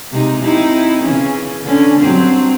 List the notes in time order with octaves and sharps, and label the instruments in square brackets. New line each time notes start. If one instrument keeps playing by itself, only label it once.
[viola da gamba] C3 G#3 D#4
C4 D#4 E4
C#3 E3 C#4
D3 C#4
G2 F#3 C4